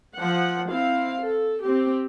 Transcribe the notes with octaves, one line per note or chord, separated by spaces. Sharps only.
F3 F#5
C4 E4 F5
A4
C4 G4